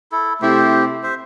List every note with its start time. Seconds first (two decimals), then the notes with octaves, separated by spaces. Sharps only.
0.12 E4 A4
0.42 C3 A3 E4 G4 C5
1.03 C5 E5